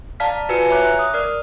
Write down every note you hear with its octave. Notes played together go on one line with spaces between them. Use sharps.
D5 F5 A5 A#5 F6 B6
F4 F#4 B4 G#5 E6 C#7
C#5 E5 A#5 D6 F#6
D#6
A#4 D5 F6